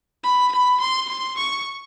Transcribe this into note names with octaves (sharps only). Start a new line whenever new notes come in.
B5
B5
C6
C6
C#6